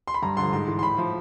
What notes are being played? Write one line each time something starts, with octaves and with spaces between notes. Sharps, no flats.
C6
B5
G2 A#5
D3 F3 C6
G#2 C6
E3
C6
A2 B5
F3